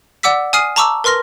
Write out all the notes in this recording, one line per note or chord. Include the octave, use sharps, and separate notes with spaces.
D5 F#5 D6 E6 B6
G#5 D#6 F6 C7 D#7
A5 A#5 C#6 D6 E6
A#4 B4 C6 F6 A#6